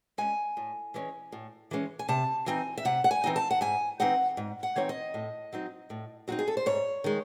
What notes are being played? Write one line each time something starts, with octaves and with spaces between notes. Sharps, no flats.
G#3 C#4 G#5
A2
E3 G#3 C#4
A2
E3 G#3 C#4
G#5
C3 A5
E3 C4 D#4 G#5
E5
C3 F#5
F#5
G#5
E3 C4 D#4
A5
F#5
G#2 G#5
E3 C4 D#4 F#5
G#2
F#5
E3 C4 D#4 C#5
D#5
A2
F#3 C4 D#4
A2
F#3 C4 D#4 F#4
G#4
A4
C5
G#2 C#5
D#3 G#3